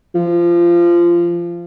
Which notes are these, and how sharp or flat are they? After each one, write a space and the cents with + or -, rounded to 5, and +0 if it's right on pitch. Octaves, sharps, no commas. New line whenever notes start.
F3 -20